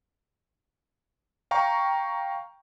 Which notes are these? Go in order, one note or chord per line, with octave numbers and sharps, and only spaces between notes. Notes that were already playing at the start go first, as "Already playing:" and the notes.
F5 G5 A#5 C#6